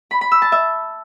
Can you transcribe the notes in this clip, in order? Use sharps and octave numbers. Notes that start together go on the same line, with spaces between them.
B5
B5
E6
A5
E5